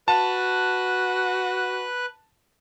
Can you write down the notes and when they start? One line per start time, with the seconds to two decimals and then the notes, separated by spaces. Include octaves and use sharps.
0.08 F#4 B4 A5 F#6